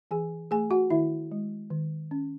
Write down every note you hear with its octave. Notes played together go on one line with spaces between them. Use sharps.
E3 G#4 G#5
A3 G#4 G#5
F#4 F#5
D#3 E4 E5
G#3
D#3
C#4